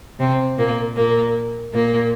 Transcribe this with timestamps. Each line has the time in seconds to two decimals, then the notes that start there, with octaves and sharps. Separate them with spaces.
0.19 C3 C4
0.57 A#2 A#3
0.95 A#2 A#3
1.72 A#2 A#3